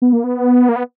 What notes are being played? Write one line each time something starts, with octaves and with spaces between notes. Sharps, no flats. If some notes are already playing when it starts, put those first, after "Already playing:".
B3
A#3
B3
A#3
B3